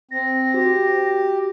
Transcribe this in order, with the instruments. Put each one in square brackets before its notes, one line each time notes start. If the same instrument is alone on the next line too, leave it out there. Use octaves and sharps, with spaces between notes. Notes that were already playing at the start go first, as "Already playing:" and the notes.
[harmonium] C4 [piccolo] A#6
[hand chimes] F#4 [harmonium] G4